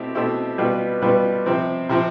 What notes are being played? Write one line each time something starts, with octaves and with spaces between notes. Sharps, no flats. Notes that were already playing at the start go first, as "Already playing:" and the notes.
Already playing: B2 A3 C4 E4 G4
B2 A3 C4 E4 G4
B2 G3 B3 F4 B4
B2 G3 B3 F4 B4
C3 F3 C4
C3 F3 C4